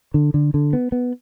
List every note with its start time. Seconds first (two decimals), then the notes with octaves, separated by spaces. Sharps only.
0.14 D3
0.34 D3
0.54 D3
0.73 B3
0.92 B3